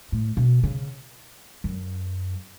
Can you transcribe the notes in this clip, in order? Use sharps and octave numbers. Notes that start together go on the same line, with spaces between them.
A2
B2
C#3
F#2